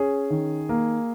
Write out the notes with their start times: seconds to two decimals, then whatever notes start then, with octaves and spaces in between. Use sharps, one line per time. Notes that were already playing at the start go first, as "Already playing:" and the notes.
Already playing: C#4 G#4
0.30 D#3
0.69 A#3